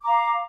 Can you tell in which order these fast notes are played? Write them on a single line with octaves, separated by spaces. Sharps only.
D6 A#5 F5